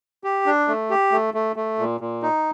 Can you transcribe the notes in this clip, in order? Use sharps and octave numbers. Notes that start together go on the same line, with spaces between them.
G4
D4
A3
G4
A3
A3
A3
A#2
A#2
D#4